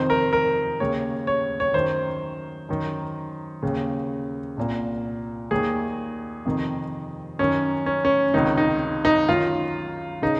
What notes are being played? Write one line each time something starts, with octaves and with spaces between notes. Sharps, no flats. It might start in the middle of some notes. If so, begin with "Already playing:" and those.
Already playing: F2 C3 D#3 C5
A#4
A#4
D#2 C#3 C#5
C#5
C#5
F#2 D#3 C5
F#2 D#3
D#2 C#3
C2 A#2
D#2 D#3 G#4
F2 C3 D#3
F#2 D#3 C#4
C#4
C#4
C#2 C3 D#3 D#4
D#4
D#4
F#2 D#3 F4
C#3 D#4